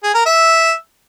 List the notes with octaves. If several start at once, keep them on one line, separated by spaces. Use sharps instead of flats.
G#4
A#4
E5